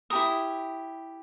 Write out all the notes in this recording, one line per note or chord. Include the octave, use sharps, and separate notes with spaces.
E4 G4 A#4 D#6